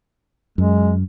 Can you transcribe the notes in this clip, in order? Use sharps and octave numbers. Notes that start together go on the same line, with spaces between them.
F#2 G#3